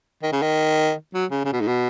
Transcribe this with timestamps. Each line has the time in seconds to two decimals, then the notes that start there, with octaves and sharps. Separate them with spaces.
0.23 D#3
0.33 C#3
0.42 D#3
1.14 F#3
1.31 C#3
1.45 C#3
1.53 B2
1.61 G#2
1.67 B2